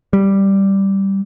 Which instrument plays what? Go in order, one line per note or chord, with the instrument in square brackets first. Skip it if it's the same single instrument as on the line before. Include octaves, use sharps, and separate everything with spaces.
[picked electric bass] G3